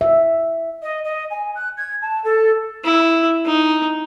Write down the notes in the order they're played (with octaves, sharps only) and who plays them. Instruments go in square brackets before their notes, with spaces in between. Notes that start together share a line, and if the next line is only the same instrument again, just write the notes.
[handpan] E5
[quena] D#5
D#5
G#5
F#6
G#6
A5
A4
[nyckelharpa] E4
D#4